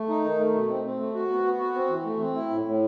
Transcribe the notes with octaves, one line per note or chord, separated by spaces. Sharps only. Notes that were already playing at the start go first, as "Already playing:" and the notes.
Already playing: A3
D#4
D#3
A3
B2
C4
C4
A3
F#4
B3
B3
F#4
C4
E3
A3
C4
E4
A2
A2